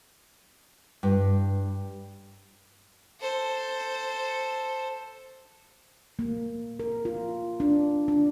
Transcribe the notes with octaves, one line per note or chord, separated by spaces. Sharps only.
G2
A4 C5
A#3
A#4
F4
D4
D4